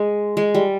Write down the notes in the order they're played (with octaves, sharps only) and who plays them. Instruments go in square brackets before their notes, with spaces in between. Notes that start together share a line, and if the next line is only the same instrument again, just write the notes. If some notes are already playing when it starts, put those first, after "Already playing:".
Already playing: [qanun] G#3
G#3
G3